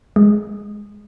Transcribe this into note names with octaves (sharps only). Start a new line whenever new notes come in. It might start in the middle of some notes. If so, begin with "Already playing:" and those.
G#3